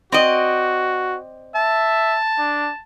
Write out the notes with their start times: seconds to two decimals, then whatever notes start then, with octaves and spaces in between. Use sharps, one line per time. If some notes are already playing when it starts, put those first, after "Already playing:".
0.12 C4 F#4 D5 D#5
1.55 E5 A5
2.39 D4